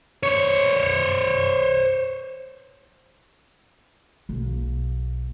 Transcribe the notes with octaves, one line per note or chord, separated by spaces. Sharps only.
C5 C#5
B1 A#3